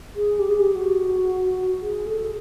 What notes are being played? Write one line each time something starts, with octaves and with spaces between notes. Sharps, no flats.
G#4
G4
G#4
G4
F#4
G#4
A4